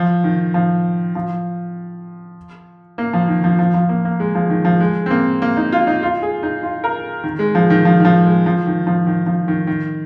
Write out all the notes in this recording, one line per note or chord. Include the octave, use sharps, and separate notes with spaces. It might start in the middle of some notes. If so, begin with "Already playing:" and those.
Already playing: F3
D#3
F3
F3
A#3
F3
D#3
F3
F3
F3
A#3
A#3
G#3
F3
D#3
F3
G#3
C4
A#3
A#3
D#4
F4
D#4
F4
G#4
D#4
F4
A#4
D#3
G#3
F3
D#3
F3
D#3
F3
G#3
F3
D#3
F3
D#3
F3
D#3
D#3